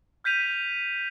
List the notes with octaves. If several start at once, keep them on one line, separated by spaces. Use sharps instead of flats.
F6 G6 B6 D#7 F7